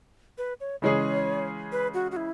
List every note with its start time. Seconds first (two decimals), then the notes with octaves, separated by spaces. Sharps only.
0.38 B4
0.60 C#5
0.82 C#3 E3 G#3 C#4 G#4 C#5
1.72 B4
1.94 F#4
2.11 F#4
2.17 E4